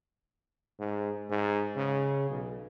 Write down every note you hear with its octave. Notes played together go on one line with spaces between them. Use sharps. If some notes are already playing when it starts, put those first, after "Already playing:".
G#2
G#2
C#3
B1